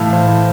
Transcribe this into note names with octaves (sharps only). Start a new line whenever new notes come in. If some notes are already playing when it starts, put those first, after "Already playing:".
Already playing: A2 E3 F5 A5
C5